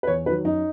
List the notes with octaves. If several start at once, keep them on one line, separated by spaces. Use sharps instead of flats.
B4
E2 C#5
D#3 F#3 B4
F#2 D#4